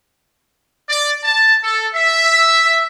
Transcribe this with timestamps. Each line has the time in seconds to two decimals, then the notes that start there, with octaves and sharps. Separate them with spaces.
0.89 D5
1.24 A5
1.63 A4
1.94 E5